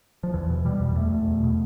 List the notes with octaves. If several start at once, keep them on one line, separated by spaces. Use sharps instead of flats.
F3
E2 E3
B2
B2 G3
E2
G3
B2 A3
E2
E2
B2